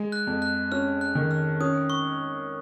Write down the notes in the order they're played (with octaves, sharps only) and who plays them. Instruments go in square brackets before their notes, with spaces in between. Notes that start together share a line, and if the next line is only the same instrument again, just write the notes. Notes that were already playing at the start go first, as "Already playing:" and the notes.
Already playing: [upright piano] G#3
[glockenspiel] F#6
[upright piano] F2
[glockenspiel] F#6
[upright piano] C#4 [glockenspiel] F6
[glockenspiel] F#6
[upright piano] D#3
[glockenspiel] F6
[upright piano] C#4 [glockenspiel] D#6
[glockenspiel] C#6